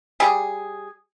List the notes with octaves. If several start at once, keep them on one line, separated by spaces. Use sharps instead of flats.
G3 G#4